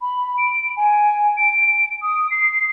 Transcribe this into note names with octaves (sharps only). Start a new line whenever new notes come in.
B5
D7
G#5
D7
D#6
C7